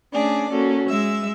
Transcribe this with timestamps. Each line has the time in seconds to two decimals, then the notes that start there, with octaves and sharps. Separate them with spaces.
0.13 A3 C#4 D4 G#4 D5
0.50 A#3 C#4 F#4 A4
0.88 G#3 E5 E6